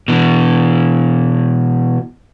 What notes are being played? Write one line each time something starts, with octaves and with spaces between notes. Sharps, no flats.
B2 E3